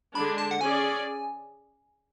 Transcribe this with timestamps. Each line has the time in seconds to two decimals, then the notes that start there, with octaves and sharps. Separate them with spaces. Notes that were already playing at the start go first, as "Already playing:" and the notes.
0.15 D3 G#3 D4 B5
0.38 A5
0.51 F#5
0.61 C#4 G#4 D5 G#5